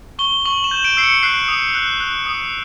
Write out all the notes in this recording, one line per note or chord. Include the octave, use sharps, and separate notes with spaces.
C#6 G7
C#6 F#7
E7
G6
D7
E6 C7
C#7
F#6 C7
D#6
F#6
F#6
D#6